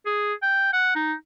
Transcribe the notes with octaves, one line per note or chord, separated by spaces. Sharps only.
G#4
G5
F#5
D#4